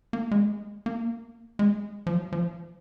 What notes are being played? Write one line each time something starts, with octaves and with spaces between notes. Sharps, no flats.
A#3
G#3
A#3
G#3
F3
F#3
F3